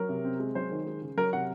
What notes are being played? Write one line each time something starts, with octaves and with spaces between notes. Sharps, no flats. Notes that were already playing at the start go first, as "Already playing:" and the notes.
Already playing: F#3 A#4
C3
C4
G#3
F#3 C5
D#3
G#3
C#3
F#3 A#4
C3 F#5